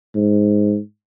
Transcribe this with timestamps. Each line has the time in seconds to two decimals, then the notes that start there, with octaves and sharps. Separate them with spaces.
0.15 G#2